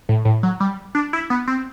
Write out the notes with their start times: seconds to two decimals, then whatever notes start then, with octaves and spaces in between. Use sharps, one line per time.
0.09 A2
0.25 A2
0.43 F#3
0.60 G3
0.95 D4
1.13 E4
1.30 B3
1.48 C4